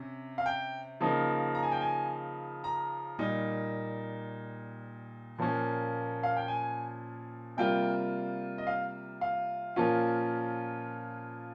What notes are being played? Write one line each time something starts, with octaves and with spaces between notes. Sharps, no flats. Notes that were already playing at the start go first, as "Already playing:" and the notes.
Already playing: C3 C#4
F5
G5
C#3 F3 A#3 D#4
A#5
G#5
G5
G#5
A#5
A#2 G3 A#3 D#4
A#2 F3 A#3 C#4
F5
G5
G#5
C3 G3 A#3 F4 G5
D#5
F5
F5
A#2 F3 A#3 C#4 F4